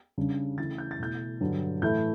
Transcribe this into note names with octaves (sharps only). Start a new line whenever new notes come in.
C#3 G3 D4
C#3 E3 A3 E4 A6
G6
A6
B2 A3 E4 G6
G2 D3 F#3
A2 E3 A3 E4 G6